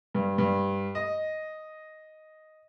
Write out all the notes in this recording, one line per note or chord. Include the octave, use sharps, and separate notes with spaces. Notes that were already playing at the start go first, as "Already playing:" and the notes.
G2
G2
D#5